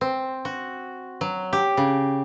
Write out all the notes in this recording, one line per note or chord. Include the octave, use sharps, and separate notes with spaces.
C4
F#4
F#3
G4
C#3